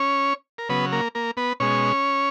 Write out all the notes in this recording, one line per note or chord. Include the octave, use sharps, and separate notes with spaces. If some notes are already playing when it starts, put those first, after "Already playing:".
Already playing: C#4 C#5
A#4
C#3 F#3 B3 B4
A#3 A#4
A#3 A#4
B3 B4
B2 G#3 C#4 C#5